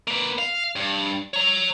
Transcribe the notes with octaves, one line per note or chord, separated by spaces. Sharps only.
A#3 B4
F5
G2
C#5 A#5